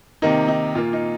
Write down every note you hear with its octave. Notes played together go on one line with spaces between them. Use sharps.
C3 D#3 A#3 D#4
D#4
A#2 A#3 F4
D#4